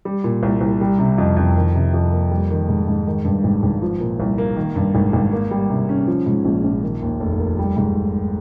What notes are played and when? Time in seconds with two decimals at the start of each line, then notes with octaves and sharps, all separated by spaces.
0.05 G3
0.24 A#2
0.43 C2
0.61 C2
0.81 G3
0.99 C3
1.18 F2
1.36 F2
1.55 D#3
1.75 C3
1.94 F2
2.12 A#3
2.31 G3
2.50 D#3
2.68 G#2
2.88 G#2
3.07 D#3
3.25 G2
3.44 G#1
3.63 G#1
3.82 F3
4.00 A#2
4.20 C2
4.38 A#3
4.56 D#3
4.76 G2
4.95 G#1
5.13 G#1
5.32 A#3
5.51 G3
5.70 C3
5.89 C#4
6.07 F3
6.26 G#2
6.45 A#1
6.64 A#1
6.83 D#3
7.02 D#2
7.20 F1
7.39 A#3
7.59 G3
7.77 G#2